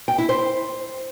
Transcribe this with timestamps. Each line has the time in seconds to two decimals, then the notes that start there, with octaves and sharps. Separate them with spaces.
0.08 G5
0.18 E4
0.29 C5